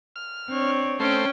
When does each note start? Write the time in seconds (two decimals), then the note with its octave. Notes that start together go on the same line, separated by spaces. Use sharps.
0.16 F6
0.49 C4 D4 C#5
1.00 A3 C#4 C5 G5